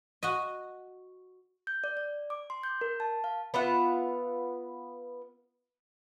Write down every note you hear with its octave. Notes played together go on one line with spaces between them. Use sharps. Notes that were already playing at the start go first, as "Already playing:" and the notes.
F#4 D#5
G6
D5
D5
D6
C6
G6
A#4
A5
F5
B3 F4 E5 F#5